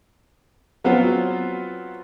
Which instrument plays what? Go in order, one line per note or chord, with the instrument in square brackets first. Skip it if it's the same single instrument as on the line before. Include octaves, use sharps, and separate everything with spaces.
[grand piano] F#3 B3 C4 F4 F#4